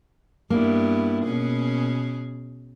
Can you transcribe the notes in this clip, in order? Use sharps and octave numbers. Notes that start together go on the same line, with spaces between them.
G2 A#3 B3 E4
B2 C#4 G#4